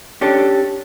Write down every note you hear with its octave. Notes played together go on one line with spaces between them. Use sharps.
C#4 D4 G4 A4